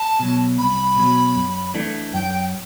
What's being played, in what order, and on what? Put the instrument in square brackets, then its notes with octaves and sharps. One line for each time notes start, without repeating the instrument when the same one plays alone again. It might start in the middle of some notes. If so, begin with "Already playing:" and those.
Already playing: [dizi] A5
[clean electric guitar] B2 F#3
[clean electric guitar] C2 [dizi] B5
[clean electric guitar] B2 F#3
F#2
E3 A3 D4
[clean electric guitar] F#2 [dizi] G5